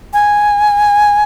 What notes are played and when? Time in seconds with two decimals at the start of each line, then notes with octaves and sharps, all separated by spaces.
0.13 G#5